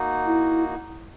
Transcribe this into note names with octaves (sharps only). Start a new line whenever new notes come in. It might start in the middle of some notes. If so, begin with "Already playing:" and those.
Already playing: A#3 D#4 F#4
E4